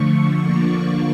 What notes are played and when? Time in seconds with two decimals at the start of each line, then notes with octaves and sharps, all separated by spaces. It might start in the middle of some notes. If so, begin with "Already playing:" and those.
Already playing: D3 F3 A3 C#6
0.38 D3 F3 A#3 D4